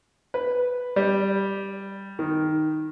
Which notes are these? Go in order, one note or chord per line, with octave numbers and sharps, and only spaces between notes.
B4
G3
D#3